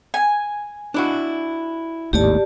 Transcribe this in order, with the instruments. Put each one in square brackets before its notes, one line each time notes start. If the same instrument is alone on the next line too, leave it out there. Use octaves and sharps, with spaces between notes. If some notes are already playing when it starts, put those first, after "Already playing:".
[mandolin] G#5
[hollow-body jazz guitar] D4 E4 F#4
[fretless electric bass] G#1 D#2 A2 [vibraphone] G4 D5 A5